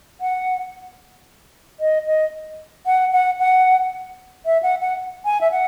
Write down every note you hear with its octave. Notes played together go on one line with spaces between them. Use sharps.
F#5
D#5
D#5
F#5
F#5
F#5
E5
F#5
F#5
G#5
E5
F#5